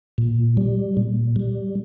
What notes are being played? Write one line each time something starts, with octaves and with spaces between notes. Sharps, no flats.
A#2
G3
A#2
G3